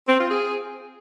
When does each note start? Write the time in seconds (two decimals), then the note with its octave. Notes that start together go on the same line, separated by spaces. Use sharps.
0.09 C4
0.19 F4
0.30 G#4